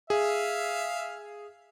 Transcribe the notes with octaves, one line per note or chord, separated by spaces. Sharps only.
G#4 E5 F5